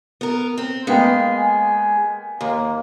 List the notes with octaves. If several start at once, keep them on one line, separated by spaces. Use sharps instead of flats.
B3 A#4
C4
G#3 A#3 B3 F5 G5
G#5
D#2 A#3